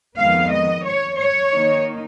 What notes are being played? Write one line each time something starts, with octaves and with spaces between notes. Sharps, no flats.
F2 D#3 G#3 B3 F5
D#5
C#5
C#5
D#3 A#3 D#4